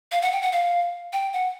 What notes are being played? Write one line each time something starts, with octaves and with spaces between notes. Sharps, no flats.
F5
F#5
G5
F#5
F5
G5
F#5